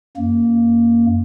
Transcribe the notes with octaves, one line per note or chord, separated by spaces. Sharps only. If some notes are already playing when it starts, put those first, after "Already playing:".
F#2 A#3